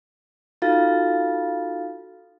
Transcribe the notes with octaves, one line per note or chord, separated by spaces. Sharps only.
D#4 F4 F#4 A4 F5 A6